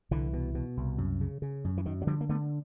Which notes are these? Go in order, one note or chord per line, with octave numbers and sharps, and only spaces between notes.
C2 D3 E3
B2
B2
C2
F#2
C#3
C#3
F#2
E3
F#2 D#3
F#3
D3 F3 G3
A#3
D3 A3 B3